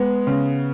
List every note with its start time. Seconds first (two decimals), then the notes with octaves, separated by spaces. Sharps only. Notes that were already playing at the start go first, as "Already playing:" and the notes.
Already playing: G#3 B3
0.27 C#3